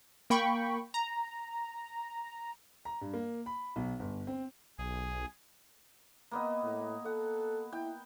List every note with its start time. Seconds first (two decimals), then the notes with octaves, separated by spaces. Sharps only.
0.30 A#3 G5 B5 C#6
0.94 A#5
2.85 A#5
3.01 G2
3.13 A#3
3.46 B5
3.76 B1
3.99 G1
4.27 C4
4.79 B1 G#4
6.31 A#3 B3 D#5
6.63 A2
7.05 A4 F#5
7.73 E4 G5